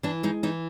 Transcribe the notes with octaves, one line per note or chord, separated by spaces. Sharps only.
E3 D4
G#3 D#4
E3 D#4